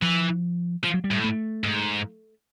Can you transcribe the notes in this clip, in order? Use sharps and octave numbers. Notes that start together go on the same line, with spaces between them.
E3 F3
F3
F#3
G3
A2
A3
G#2